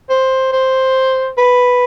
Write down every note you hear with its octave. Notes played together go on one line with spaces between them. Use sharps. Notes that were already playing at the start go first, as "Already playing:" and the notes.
C5
C5
B4